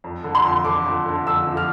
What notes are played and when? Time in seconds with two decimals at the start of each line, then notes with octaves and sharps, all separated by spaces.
0.04 F2
0.24 D3
0.35 C6
0.44 F2
0.65 D3 D6
0.86 F2
1.06 D3
1.27 F2 E6
1.47 F3
1.57 F6